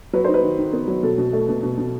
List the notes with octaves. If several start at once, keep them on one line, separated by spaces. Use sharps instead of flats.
F#3 B4
D#4 C5
B4
D#3
D#3
B3
F#3
B2 A4
B2
A3
B2
B2
B2